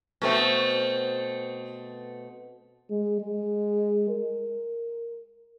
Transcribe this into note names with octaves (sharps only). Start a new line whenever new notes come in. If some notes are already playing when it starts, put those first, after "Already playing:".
B2 A3 C4
G#3
G#3
A#4